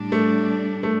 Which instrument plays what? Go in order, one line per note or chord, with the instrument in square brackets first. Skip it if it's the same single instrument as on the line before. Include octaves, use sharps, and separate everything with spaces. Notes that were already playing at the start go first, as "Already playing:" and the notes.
Already playing: [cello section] A2 G3 D4
[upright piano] A3
A3